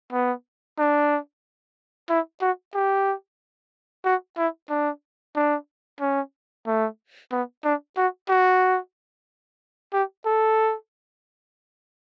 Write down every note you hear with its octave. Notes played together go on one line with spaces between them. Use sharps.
B3
D4
E4
F#4
G4
F#4
E4
D4
D4
C#4
A3
B3
D4
F#4
F#4
G4
A4